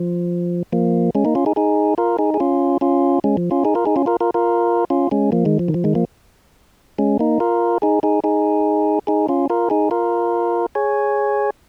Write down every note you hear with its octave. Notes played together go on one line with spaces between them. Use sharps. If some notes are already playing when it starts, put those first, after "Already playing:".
Already playing: F3
F3 A#3
G#3 C#4
A#3 D#4
C#4 F4
D#4 G#4
D#4 G#4
F4 A#4
D#4 G#4
G#4
C#4 F4
C#4 F4
G#3 C#4
F3
C#4 F4
D#4 G#4
F4 A#4
D#4 G#4
C#4 F4
F4 A#4
F4 A#4
F4 A#4
C#4 F4
G#3 C#4
F3 A#3
D#3 G#3
F3
D#3
F3
D#3 G#3
F3 A#3
G#3 C#4
A#3 D#4
F4 A#4
D#4 G#4
D#4 G#4
D#4 G#4
D#4 G#4
C#4 F4
F4 A#4
D#4 G#4
F4 A#4
G#4 C#5